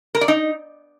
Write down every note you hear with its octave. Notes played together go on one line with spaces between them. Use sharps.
A#4
D5
D#4